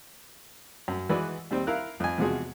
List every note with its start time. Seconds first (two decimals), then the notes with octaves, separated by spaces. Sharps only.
0.88 F#2
1.09 E3 G#3 F#4 B4 D5
1.51 D#2 G3 C4
1.67 E4 A#4 F5 F#6
2.00 F2 G#5
2.18 E2 C3 F3 G#3 F#4 G#4